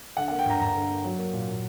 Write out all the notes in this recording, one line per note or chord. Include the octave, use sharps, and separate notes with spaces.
D3 F#5
F#5
A#3
G5
G2 A#5
G2 A#5
D3
A#3
F#3
A#3
A#2
A#2